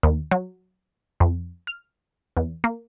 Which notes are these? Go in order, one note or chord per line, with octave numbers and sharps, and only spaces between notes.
D#2
F#3
F2
F6
E2
A#3